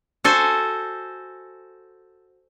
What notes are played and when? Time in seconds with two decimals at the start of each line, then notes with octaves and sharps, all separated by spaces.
0.24 F#4 A4 C5 G#5